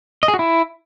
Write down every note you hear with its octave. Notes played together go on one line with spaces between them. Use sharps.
D#5
G#4
F#4
E4